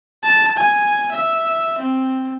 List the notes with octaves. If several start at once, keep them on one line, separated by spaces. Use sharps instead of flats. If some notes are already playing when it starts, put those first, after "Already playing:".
A5
G#5
E5
C4